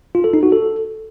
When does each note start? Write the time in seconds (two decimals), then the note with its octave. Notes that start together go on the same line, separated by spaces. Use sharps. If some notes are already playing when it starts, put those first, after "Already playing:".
0.15 F4
0.24 A4
0.33 D#4
0.43 F#4
0.52 A4